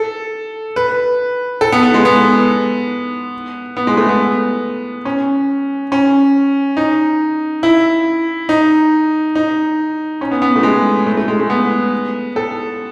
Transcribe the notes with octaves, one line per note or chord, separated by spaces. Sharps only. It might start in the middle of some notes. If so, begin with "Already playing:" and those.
Already playing: A4
B4
A4
B3
B3
G#3
B3
B3
G#3
A3
B3
C#4
C#4
D#4
E4
D#4
D#4
C#4
B3
B3
A3
G#3
A3
A3
G#3
A3
B3
A4